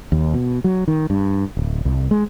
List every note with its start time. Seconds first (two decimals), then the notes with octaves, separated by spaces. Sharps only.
0.12 D#2
0.34 B2
0.64 F#3
0.88 D#3
1.10 G2
1.57 D1
1.85 C2
2.11 G#3